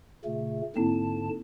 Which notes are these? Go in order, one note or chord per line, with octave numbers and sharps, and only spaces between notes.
A#2 C#3 A3
G#2 D3 A#3 C4 E4 A5